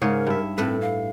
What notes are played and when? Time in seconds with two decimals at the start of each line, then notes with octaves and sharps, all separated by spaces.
0.02 G#2 C#3 G#4 A#4 C#5
0.27 G2 E5
0.58 A2 C4 A4 B4
0.81 F5